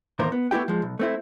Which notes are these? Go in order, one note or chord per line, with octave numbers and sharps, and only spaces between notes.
E2 A2 D#3 A#3 A#4 C5
B3
A3 B3 E4 G4 G5
F3 G#3
B1
A3 C4 E4